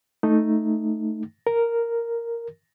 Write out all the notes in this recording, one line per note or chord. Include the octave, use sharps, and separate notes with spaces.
A3 D#4
A#4